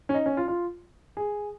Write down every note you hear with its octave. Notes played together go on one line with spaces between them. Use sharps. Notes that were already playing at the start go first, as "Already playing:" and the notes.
C#4
D#4
C#4
F4
F4
G#4